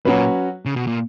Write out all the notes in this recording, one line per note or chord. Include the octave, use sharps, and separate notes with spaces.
A#2 F#3 C#4 F#4 B4
C#3
B2
A#2